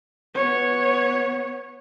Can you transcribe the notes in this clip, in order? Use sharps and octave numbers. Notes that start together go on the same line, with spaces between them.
B3 C#5